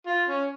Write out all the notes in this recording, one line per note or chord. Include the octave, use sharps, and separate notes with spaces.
F4
C#4